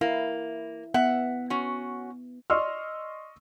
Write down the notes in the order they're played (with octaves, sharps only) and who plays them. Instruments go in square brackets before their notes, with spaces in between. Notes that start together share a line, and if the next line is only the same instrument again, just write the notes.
[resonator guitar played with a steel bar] A#3 [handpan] E4
[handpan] B3 [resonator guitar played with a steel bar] E5 F#5
[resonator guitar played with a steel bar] C#4 F#4
[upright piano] D5 D#5 C6 C#6 E6 F6